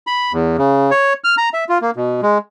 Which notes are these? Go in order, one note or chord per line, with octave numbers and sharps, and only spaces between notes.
B5
E2
C#3
C#5
F6
A#5
E5
F4
A#3
B2
G#3